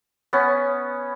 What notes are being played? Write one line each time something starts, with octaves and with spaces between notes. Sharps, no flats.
B3 C#4